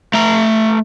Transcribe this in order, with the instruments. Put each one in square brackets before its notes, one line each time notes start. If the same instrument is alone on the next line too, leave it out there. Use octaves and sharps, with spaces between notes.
[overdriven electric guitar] A3 A#5